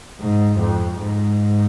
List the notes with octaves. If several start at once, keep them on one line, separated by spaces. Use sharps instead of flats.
G#2
F2
G#2